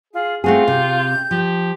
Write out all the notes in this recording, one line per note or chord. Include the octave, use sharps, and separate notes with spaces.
F4 G#4
A3 C4 F4 F#4 G#4
C3 G6
F3 G4